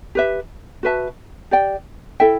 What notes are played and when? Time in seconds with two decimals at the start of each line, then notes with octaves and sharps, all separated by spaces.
0.15 G4 B4 E5
0.83 F#4 B4 E5 A5
1.51 G4 D5 G5
2.20 E4 A4 E5 G5